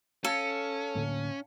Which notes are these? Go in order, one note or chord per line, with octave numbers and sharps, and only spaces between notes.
C#4 A4 F5 G#6 C#7
A2 D3 A#3